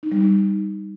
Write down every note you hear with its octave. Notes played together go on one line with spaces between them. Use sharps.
D#4
G3
D#4